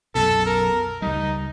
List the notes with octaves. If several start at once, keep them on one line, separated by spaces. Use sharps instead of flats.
B1 F#2 B2 A4
A#4
C#2 G3 D#4